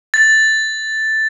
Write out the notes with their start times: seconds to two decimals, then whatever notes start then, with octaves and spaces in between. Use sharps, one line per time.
0.14 A6